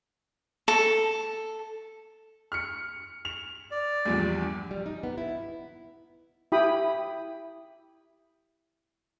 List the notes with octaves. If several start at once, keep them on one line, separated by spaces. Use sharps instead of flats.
A4
F6 C#7
F7
D5
A#1 E2 G2
G3
D#4
B3
E4
E4 G4 G5 B5 D#6